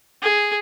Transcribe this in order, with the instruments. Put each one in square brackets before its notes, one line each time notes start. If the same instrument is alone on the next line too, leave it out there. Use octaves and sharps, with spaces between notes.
[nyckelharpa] G#4